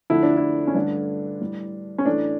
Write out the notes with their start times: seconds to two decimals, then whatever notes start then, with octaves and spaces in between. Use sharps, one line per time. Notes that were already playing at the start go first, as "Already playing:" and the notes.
0.10 F2 D3 A3 E4
0.23 D4
0.37 E4
0.67 C#4
0.75 G2 D3 A3 D4
1.41 A2 G3
1.98 C#4
2.05 A2 E3 A3 D4